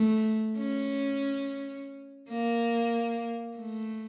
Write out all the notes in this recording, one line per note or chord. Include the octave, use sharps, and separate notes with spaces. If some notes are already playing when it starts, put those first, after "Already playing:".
Already playing: A3
C#4
A#3
A3